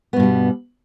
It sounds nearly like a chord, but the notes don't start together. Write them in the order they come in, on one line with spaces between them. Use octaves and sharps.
B3 G2 B2 G3